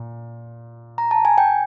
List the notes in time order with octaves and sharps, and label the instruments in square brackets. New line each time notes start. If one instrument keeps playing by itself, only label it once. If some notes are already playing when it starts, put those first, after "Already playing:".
Already playing: [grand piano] A#2
[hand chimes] A#5
A5
G#5
G5